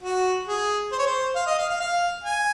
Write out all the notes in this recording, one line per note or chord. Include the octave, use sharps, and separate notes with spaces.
F#4
G#4
C5
C#5
C5
F5
D#5
F5
F5
F5
G#5